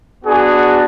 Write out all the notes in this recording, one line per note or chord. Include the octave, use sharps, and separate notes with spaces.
B3 D4 F#4 G#4